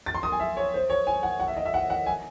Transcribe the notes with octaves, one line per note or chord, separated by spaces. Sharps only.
A6
C6
D#6
G#5
E5
C#5
C5
C#5
G#5
F#5
F#5
E5
D#5
E5
F#5
F#5
G#5